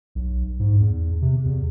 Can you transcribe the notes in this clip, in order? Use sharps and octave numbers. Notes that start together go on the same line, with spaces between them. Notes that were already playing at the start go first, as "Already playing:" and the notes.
B1
G#2
E2
C3
E2